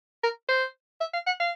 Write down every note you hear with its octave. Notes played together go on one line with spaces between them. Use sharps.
A#4
C5
E5
F5
F#5
F5